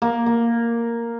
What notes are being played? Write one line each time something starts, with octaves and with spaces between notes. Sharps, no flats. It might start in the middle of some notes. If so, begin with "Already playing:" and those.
A#3
A#3